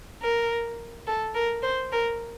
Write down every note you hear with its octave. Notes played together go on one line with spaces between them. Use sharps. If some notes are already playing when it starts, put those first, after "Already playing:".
A#4
A4
A#4
C5
A#4